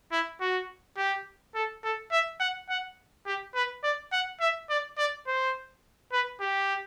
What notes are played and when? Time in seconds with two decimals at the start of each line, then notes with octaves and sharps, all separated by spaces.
0.12 E4
0.41 F#4
0.97 G4
1.55 A4
1.84 A4
2.11 E5
2.40 F#5
2.69 F#5
3.26 G4
3.55 B4
3.83 D5
4.12 F#5
4.40 E5
4.70 D5
4.98 D5
5.27 C5
6.13 B4
6.41 G4